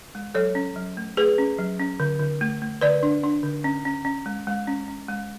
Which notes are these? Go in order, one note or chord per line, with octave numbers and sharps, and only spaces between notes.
G#3
F#3 A4 C#5
C#4
F#3
A3
A3 G#4 B4
C#4
F#3
C#4
D3
D3
A3
A3
D3 B4 D5
D4
D4
D3
C#4
C#4
C#4
G#3
G#3
C#4
C#4
G#3